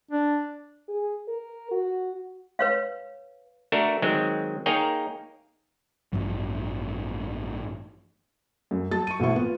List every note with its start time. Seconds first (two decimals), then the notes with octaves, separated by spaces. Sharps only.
0.11 D4
0.88 G#4
1.28 A#4
1.71 F#4
2.59 B4 C#5 F5
3.72 A3 D4 F#4 A4 A#4
4.02 D#3 F#3 G#3 C4
4.66 A#3 D#4 G#4 A#4 C#5 G5
6.13 A1 G2 F3
8.71 F#2
8.91 F#3 A5 A6
9.07 C#6 D#7
9.20 A1 B2 A3 C4 E4 C#6
9.35 A#2 B3 F4